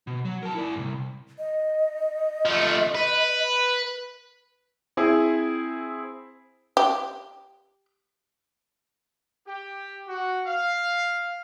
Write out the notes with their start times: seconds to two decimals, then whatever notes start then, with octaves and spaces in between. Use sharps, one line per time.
0.07 B2
0.25 F#3
0.43 A#4 A5
0.55 E4 D5
0.76 C2 G2
1.39 D#5
2.46 F3 A3
2.95 B4
4.97 C4 E4 G#4
6.77 G4
9.47 G4
10.08 F#4
10.46 F5